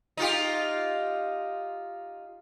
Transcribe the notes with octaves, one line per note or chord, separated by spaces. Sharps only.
D#4 F4 G4